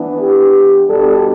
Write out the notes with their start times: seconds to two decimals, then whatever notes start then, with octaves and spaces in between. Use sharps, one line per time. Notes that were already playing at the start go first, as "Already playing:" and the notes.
Already playing: E3 B3 D4
0.20 G4
0.88 B2 G3 D4 A4